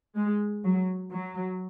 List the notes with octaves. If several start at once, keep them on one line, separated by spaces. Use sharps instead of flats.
G#3
F#3
F#3